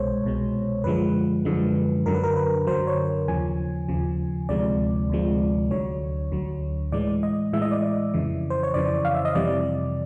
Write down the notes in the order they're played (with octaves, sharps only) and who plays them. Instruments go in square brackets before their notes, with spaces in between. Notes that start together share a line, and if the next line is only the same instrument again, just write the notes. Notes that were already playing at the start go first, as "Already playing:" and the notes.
Already playing: [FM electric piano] C2 B2 G#3 C5 C#5
C2 B2 G#3
F#2 D3 F3 G#3 B4
F#2 D3 F3 G#3
F#2 D3 F#3 A#4
B4
A#4
B4
F#2 D3 F#3 C5
C#5
D#2 C#3 F3 G#5
D#2 C#3 F3
D2 C3 F3 G#3 D5
D2 C3 F3 G#3
D2 D3 F#3 C#5
D2 D3 F#3
A2 E3 G#3 D5
D#5
A2 E3 G#3 E5
D#5
D5
D#5
F2 C#3 E3
C5
C#5
F2 C#3 E3 D5
F5
E5
D#5
F2 C3 E3 G3 D5